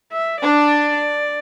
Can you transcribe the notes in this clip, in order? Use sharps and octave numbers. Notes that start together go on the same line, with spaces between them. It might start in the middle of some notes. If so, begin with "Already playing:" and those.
E5
D4 D5